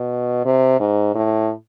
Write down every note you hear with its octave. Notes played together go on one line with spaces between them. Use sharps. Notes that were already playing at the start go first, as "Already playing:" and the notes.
Already playing: B2
C3
G#2
A2